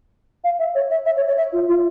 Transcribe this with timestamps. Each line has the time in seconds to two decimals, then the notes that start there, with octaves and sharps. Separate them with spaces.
0.44 F5
0.59 E5
0.75 C#5
0.90 E5
1.06 E5
1.17 C#5
1.27 C#5
1.37 E5
1.53 F4
1.69 F4